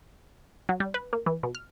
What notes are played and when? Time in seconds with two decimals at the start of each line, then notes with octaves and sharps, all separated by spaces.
0.69 F#3
0.80 G3
0.94 B4
1.13 A#3
1.26 E3
1.43 B2
1.55 F6